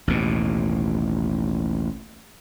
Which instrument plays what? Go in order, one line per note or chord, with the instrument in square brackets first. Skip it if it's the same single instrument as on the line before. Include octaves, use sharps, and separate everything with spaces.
[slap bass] A1 D#2 B2